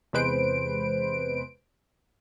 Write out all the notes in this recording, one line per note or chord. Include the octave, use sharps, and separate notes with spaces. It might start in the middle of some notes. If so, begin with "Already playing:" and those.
E2 C3 G#3 B4 C5 D7